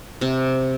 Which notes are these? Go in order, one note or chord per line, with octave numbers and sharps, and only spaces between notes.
C3